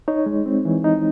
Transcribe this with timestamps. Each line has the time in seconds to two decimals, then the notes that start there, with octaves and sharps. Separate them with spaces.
0.08 D#4 C#5
0.26 G#3
0.46 C4
0.65 E3
0.84 D#4